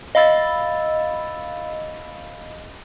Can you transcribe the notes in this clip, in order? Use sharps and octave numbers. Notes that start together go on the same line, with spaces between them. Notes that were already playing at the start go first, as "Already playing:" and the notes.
D#5 F5 B5 E6 A6